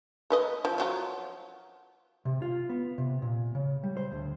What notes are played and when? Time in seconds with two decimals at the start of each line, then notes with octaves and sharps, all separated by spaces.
0.30 A4 B4 D#5
0.65 F3
0.78 F3 F#3 F4
2.25 C3
2.42 F4
2.69 B3
2.98 C3
3.22 A#2
3.55 C#3
3.83 G3
3.97 C5
4.12 D2